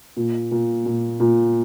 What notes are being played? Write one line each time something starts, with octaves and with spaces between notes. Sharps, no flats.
A#2
A#2
A#2
A#2